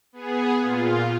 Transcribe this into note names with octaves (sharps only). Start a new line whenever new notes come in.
B3 G#4
A#2 F4